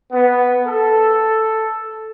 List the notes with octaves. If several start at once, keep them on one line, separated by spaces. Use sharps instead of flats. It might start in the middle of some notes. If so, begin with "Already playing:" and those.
B3
A4